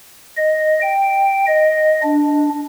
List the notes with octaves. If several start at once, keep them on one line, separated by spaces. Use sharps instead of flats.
D#5
G5
D#5
D4